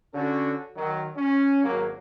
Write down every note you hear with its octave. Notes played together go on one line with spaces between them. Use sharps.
D3 C#4 F#4 A4
D#3 F#3
C#4
G#1 F#3 A#3